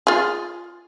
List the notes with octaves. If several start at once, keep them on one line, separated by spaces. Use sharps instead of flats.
F4 G#4